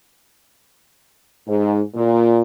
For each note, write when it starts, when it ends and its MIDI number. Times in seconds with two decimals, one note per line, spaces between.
1.48 1.80 44
1.95 2.42 46